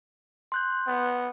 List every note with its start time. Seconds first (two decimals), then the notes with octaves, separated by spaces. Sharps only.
0.52 C6 F#6 G6
0.87 B3